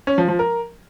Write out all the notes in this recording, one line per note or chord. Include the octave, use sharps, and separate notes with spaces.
C#4
F3
F3
A#4